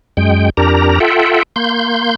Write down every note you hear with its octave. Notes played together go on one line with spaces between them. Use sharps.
F#2 G#3 G5
F2 D4 G4 A#4 A#5
F4 A4 E5 F#5 G5
A#3 C6 G6